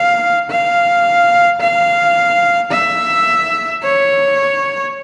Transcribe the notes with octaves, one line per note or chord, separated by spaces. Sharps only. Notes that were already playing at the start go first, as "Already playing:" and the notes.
Already playing: F5
F5
F5
E5
C#5